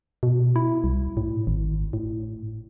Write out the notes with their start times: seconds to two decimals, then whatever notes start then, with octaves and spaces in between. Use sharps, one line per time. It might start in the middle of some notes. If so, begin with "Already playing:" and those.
0.23 B2
0.56 E4
0.84 C2
1.17 A2
1.47 G#1
1.93 A2